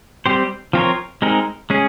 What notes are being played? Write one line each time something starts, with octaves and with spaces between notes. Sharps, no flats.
G3 C4 G4 C5
F3 C4 F4 A#4 C#5
G#3 C4 D#4 A#4
G#3 C#4 G#4